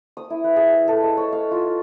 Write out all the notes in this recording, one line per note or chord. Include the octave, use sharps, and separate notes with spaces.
D#6
E4
B4
G#4
E5
A4
D#5
C#5
F5
F4
F4